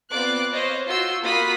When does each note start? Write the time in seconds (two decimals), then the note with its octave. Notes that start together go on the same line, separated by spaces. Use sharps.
0.10 B3 C4 F4 D5 D6 F#6
0.53 C5 C#5 D#5 F5
0.87 F4 F#4 C6 E6 G6
1.22 A#3 F4 F#4 B5 D#6 B6